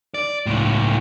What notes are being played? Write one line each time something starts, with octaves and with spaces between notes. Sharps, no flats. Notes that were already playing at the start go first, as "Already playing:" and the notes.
D5
C#2 A2